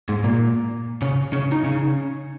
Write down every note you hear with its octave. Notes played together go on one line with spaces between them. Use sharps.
G#2 G#3
A#2 A#3
C#3 C#4
C#3 C#4
D#4
C#3 C#4